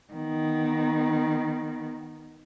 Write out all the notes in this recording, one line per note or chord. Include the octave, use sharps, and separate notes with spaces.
D#3 B3